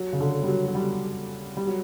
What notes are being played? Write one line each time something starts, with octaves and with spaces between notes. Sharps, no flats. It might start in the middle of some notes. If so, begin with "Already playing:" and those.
Already playing: F#3
C#3
D3
G3
F#3
F#3
G3
G3
F#3